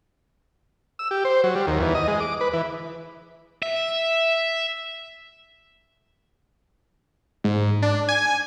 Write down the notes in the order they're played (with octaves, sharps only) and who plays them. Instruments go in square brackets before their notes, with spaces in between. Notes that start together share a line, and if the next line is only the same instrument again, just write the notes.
[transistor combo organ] E6
G4
C5
F#3
G3
D#2
E2
D#5
G#3
D6
B4
E3
[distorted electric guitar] E5
[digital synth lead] G#2
D4
G#5